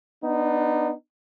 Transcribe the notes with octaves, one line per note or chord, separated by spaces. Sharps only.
B3 D4 D#4